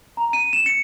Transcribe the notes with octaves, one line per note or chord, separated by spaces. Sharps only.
A#5
D#7
E7
C#7